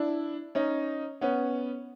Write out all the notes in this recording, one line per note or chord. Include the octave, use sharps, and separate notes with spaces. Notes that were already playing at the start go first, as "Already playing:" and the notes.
Already playing: D4 E4
C#4 D#4
B3 C#4